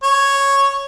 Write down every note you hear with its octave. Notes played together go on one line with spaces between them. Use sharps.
C#5